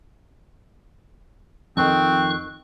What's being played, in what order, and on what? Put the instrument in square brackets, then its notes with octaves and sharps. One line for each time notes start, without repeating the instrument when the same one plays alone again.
[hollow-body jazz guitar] F2 D#3 [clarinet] C4 [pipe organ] C#6 F#6